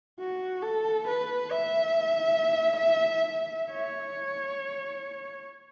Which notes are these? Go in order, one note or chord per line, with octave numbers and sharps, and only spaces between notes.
F#4
A4
B4
E5
C#5